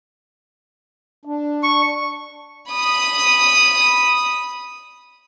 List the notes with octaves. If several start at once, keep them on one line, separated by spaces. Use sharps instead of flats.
D4
C#6
B5 D#6